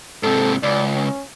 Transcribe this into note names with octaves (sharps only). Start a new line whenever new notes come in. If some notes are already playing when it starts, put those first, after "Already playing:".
G#2 C3 A4
C#2 D5
C#4